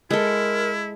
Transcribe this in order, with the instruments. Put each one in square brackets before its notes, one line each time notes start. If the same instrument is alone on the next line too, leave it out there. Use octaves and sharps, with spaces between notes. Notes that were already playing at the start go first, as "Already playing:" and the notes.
[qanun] G#3 A4 [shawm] E4 [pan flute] A#4